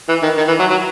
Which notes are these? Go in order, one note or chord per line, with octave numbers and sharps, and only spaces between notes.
E3
D#3
D#3
E3
F#3
F#3